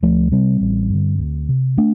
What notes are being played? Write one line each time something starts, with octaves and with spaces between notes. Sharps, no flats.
D2 F3 A3
C3 G3 C4
A1
G2 D3
D2
C3
A3 D4